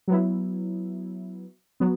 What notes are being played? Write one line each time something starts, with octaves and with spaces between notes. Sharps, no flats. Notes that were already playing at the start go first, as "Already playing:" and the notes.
F#3 B3 E4
F#3 B3